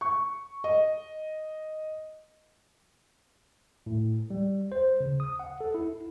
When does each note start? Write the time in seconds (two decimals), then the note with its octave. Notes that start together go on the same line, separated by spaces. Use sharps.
0.01 C#6
0.64 D#5
3.86 A2
4.30 G3
4.72 C5
5.00 C#3
5.20 D#6
5.39 F#5
5.61 A4
5.74 E4